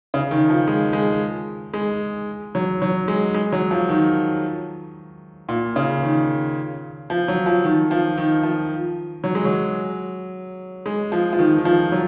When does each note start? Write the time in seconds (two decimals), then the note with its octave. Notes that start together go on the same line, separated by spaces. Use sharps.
0.14 C#3
0.31 D#3
0.49 F3
0.67 G#3
0.93 G#3
1.73 G#3
2.55 F#3
2.82 F#3
3.08 G#3
3.34 G#3
3.52 F#3
3.71 F3
3.89 D#3
5.49 A#2
5.76 C#3
6.03 D#3
7.10 F3
7.28 F#3
7.46 F3
7.64 D#3
7.91 F3
8.17 D#3
8.43 F3
9.24 F#3
9.35 G#3
9.45 F#3
10.86 G#3
11.12 F3
11.33 F3
11.39 D#3
11.58 D#3
11.65 F3
11.92 F#3